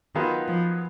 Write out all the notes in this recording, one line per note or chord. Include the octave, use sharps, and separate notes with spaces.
D#3 F#3 B3 F4 G#4 B4
F3